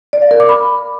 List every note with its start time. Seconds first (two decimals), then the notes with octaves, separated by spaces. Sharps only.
0.13 D5
0.22 F5
0.31 A#4
0.40 D6
0.49 B5